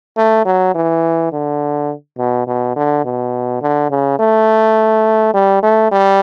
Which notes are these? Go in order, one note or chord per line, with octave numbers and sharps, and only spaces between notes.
A3
F#3
E3
D3
B2
B2
D3
B2
D3
C#3
A3
G3
A3
G3